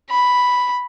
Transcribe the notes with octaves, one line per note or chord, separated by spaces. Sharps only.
B5